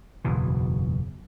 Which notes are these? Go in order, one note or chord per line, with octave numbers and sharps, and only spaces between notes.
F#1 E2 B2 E3